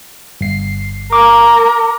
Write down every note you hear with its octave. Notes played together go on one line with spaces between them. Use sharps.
G1 C7
A#4 D6